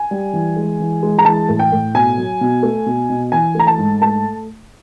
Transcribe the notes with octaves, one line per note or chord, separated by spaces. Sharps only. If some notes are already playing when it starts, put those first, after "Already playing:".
Already playing: G#5
G3
E3
G#3
E3
G#3
A#5
E3 A5
A2
G5
A2
B2 G#5
F#3
B2
A3
B2
B2
E3 G#5
A3 A#5
A5
G#2
A3 A5